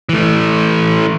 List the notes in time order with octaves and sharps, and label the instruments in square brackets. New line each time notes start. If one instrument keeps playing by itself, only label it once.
[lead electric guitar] E3 A3